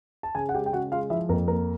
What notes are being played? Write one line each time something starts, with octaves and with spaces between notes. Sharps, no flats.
A5
C#3 G#4 G#5
F#5
G#3 G4 G5
G5
C#3 F#4 F#5
G#3 F4 F5
F3 E4 E5
F2 A#3 A#4
A#3 A#4